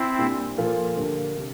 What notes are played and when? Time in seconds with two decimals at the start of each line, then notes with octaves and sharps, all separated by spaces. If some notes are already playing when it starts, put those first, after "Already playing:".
Already playing: C4 E4
0.18 A#2 G3 D4
0.58 A#2 F3 A#3 F4 A4
0.97 D3 G3 A#3 D4
1.36 C3 G3 D4